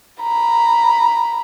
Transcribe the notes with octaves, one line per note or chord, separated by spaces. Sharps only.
A#5 B5